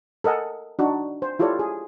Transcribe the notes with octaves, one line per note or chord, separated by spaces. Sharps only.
A4 A#4 D#5 F#5 G#5
D4 D#4 F#4
C5
E4 F4 G4 A4 C#5 D5
G#4